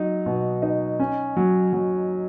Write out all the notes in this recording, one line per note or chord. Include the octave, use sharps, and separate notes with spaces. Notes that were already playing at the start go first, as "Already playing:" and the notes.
Already playing: F#3 D#4
B2
D#4
C#4
F#3
F#3